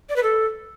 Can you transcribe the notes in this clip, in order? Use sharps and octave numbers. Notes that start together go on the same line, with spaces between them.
D5
B4
A4